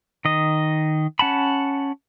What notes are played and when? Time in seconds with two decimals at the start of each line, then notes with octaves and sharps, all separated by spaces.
0.25 D#3 D#5
1.19 C#4 F#5 A5 B5